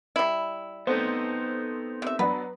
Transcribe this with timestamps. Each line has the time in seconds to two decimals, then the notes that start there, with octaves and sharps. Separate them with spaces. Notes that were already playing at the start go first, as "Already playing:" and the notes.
0.16 G3 E4
0.87 A3 B3 C4 D#4 C5
2.02 C3 E5
2.19 F#3 B3 D4 B4